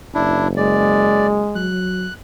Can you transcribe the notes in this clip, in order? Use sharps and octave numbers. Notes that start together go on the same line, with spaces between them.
F#1 D4 E4
G#3 D5
F#3 F#6